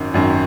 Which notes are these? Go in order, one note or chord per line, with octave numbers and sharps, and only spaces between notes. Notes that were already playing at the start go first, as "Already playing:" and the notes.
Already playing: G#1 F#2 D#3
G#1 F#2 D#3